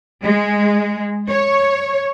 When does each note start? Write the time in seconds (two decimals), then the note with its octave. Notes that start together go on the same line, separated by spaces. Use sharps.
0.23 G#3
1.30 C#5